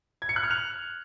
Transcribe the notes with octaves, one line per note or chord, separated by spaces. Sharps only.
G#6
C#7
F#6
F6
F7